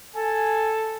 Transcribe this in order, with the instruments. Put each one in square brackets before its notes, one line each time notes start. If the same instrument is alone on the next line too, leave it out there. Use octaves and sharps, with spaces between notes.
[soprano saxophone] A4 [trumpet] G#5